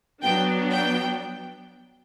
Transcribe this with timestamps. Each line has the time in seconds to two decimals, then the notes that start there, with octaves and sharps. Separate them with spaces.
0.22 F#3 B3 D4 G5
0.72 G5